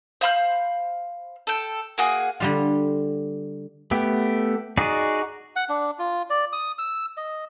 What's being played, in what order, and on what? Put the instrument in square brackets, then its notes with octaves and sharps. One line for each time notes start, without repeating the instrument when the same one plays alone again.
[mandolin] C5 F5 B5 F6
A4 G5
A#3 F#4 G#4
[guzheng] D3 G3 F4
[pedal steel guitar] A3 B3 G4
D#4 F#4 G#4 D5
[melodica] F#5
D4
F4
D5
D#6
E6
D#5